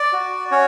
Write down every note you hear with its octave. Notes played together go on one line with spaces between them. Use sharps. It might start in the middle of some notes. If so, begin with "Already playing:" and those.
Already playing: D5
F#4
C#4 C#5